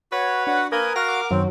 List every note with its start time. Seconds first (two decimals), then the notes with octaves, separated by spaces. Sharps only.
0.12 F#4 B4 C#5
0.47 D4 F#4 F#5
0.72 A#3 A#4 B4 G#5 D#6
0.96 F#4 A#4 F5 F#5 A#6
1.08 D6
1.31 F#2 D#3 F#3 C4